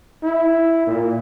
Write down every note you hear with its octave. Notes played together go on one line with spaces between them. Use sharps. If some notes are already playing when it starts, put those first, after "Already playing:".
E4
A#2